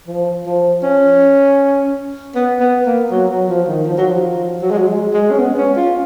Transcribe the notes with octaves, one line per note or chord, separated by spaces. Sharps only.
F3
F3
C#4
B3
B3
A#3
F#3
F#3
F3
D#3
F3
F#3
F3
F#3
G#3
F#3
G#3
G#3
C#4
B3
C#4
F4